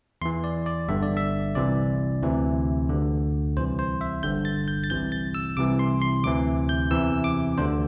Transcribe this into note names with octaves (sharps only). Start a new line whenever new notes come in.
E2 E3 C6
D5
D5
G1 G2 D3 E5
D5
E5
C2 C3 E3 D5
D2 C3 E3
D2 D3
C2 C3 E3 C5
C5
E5
G1 G2 D3 G6
A6
G6
A6
C2 C3 E3 G6
A6
E6
C2 C3 E3 D6
C6
C6
D2 C3 E3 D6
G6
E2 C3 E3 E6
D6
D2 D3 C5